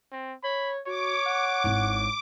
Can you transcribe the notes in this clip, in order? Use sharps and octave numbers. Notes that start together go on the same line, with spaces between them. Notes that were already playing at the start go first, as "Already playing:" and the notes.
C4
C#5 B5
F#4 C#5 D6
F#5
G#1 E4